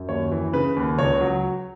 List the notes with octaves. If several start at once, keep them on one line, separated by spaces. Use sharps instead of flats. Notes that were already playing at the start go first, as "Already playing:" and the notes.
Already playing: F#2
D#2 C#5
E3
C#3 B4
D#2
C#2 C#5
F#3